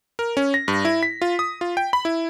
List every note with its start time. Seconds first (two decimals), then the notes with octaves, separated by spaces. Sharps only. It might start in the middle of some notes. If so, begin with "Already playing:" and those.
0.19 A#4
0.37 C#4
0.54 A#6
0.68 G2
0.85 E4
1.03 B6
1.22 F4
1.39 D#6
1.61 F4
1.77 G5
1.93 B5
2.05 E4